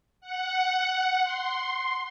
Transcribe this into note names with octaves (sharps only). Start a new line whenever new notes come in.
F#5
C6